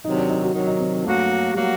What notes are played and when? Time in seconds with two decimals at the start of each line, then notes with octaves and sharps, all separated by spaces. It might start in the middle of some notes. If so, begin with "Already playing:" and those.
0.04 C3 D#3 F#3 D#4
0.17 D4
0.30 D#4
0.42 F#4
0.54 C3 D#3 F#3 D#4
0.67 D#4
0.79 C4
1.05 G2 F#3 A3 A#3 F#4
1.54 F#3 G3 A#3 F#4